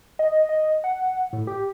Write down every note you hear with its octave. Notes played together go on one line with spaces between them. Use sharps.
D#5
D#5
F#5
A2
G4